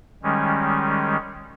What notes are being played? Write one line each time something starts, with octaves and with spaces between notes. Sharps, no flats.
D#3 G3 G#3 C#4